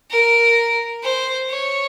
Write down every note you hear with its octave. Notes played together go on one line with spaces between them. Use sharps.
A#4
C5
C#5